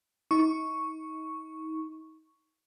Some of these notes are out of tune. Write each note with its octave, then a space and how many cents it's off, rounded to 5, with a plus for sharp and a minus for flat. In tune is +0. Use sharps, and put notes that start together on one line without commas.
D#4 +35 C#6 +0